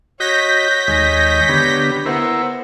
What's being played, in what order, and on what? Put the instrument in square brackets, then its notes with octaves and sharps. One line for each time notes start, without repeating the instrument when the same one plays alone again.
[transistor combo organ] F#4 D#5 [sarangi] C#5 [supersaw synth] G6 A#6 B6
[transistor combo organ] D#2 G#3 D#5
D3 B3 G4
[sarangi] B3 [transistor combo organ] E4 A#4 C5